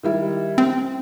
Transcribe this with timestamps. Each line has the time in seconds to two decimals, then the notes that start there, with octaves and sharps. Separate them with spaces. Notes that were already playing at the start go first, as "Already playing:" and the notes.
0.03 D#3 G3 E4
0.58 C4